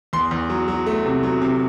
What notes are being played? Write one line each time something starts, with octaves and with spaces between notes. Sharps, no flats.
E2 C6
E2
F#3
F#3
A3
C3
F#3
C3